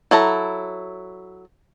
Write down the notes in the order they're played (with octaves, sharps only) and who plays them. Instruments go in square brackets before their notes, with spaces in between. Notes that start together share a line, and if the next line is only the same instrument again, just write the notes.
[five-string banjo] F#3 E4 A4 A#5